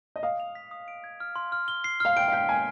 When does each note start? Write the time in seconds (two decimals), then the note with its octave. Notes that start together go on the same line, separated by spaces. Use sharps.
0.16 D#5
0.23 F5 D#6
0.40 F7
0.55 B6
0.71 D#6
0.88 D7
1.04 G#6
1.20 F6
1.36 C6
1.52 F6
1.68 G7
1.84 C7
2.00 F5 F6
2.16 G5 D7
2.28 F5
2.32 G5 B6
2.49 G#5 G#6